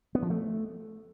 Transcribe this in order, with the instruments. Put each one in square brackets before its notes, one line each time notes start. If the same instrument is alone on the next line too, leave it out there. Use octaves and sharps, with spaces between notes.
[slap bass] B3
F3
A3